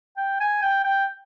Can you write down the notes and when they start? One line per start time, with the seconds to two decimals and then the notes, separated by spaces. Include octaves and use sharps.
0.17 G5
0.40 G#5
0.62 G5
0.84 G5